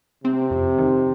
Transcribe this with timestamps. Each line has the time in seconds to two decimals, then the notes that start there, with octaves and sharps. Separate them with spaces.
0.24 C3 C4
0.51 F2
0.78 D#3